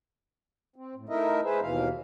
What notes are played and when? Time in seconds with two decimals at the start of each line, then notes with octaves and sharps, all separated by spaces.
0.76 C4
0.95 A2
1.09 A3 D#4 E4 A#4 D#5 E5
1.44 G#3 G#4 B4 C5 E5
1.62 D#2 B2 E3 F5